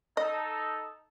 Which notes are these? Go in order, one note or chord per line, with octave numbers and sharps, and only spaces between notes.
D#4 A4 D#5